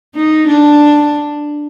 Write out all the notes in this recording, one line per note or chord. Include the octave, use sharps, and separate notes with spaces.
D#4
D4